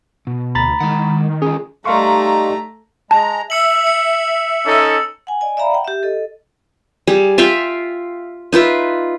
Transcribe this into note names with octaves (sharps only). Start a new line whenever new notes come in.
B2
D2 A#5 B5 A6
D#3 G#3 F#5
C#4 F4 G#4
G3 A3 D#4 F5 A#5 C6 C#6
G#3 A5 A#5
E5 E6 C#7 F#7
C#7
C#4 D#4 A4
F#5 G#5
D5 D#5 G#5
D5 E5 F5 A#5 B5
F#5 G5
G4 E5
A4 D#5
G3 G#4
F4 E5 F5 G5
D#4 F4 B4 E5